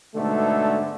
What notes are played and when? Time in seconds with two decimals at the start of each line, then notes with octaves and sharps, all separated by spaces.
0.15 G#2 B2 D3 A3